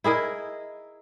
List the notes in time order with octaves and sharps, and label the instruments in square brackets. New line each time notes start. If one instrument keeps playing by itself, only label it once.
[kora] E4 G#4 A#4 D#5